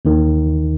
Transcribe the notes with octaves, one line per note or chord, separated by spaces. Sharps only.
D#2 D#3